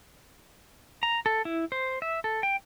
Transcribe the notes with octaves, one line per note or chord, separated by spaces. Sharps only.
A#5
A4
E4
C5
E5
A4
G5